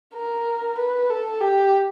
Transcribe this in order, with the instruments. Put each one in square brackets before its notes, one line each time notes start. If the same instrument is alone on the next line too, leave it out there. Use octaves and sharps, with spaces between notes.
[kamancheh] A#4
B4
A4
G4